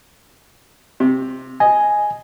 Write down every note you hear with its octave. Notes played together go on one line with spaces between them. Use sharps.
C3
D#5 G#5